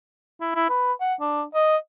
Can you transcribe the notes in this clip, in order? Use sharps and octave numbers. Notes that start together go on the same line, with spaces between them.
E4
E4
B4
F#5
D4
D#5